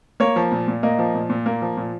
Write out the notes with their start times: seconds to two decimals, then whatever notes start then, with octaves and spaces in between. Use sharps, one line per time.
0.20 A#3 C#5
0.36 F3
0.52 A#2
0.68 A#2
0.83 A#3 D#5
0.99 F3
1.14 A#2
1.30 A#2
1.46 A#3
1.62 F3
1.77 A#2